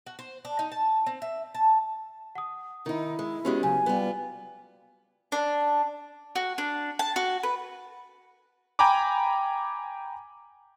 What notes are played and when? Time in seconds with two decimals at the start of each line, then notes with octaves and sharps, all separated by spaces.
0.06 F#4
0.19 C5
0.45 D4
0.59 D#4
0.72 A5
1.07 C4
1.22 E5
1.54 A5
2.35 F#5 D#6
2.86 D#3 D#4 E4
3.19 G#3
3.45 G#3 B3 C#4 F#4 G4
3.63 C#3 F#3 G#5
3.86 G3 B3 F4
5.32 D4
6.36 F#4
6.58 D4
6.99 A5
7.16 F#4
7.43 B4
8.79 G5 G#5 A#5 B5 D6